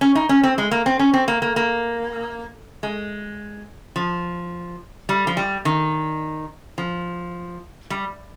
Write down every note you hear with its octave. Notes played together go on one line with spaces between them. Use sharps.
C#4
D#4
C#4
C4
G#3
A#3
C4
C#4
C4
A#3
A#3
A#3
G#3
F3
G3
F3
G3
D#3
F3
G3